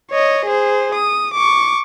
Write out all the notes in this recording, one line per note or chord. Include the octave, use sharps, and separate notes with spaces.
C#5 D#5
G#4 C5
D#6
C#6 D6